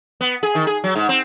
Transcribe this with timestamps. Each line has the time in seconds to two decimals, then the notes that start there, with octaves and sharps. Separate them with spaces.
0.21 B3
0.43 G#4
0.55 D#3
0.67 G#4
0.84 F#3
0.96 G#2
1.09 C4